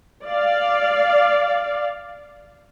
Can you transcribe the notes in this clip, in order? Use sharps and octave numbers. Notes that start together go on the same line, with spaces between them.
D5 F5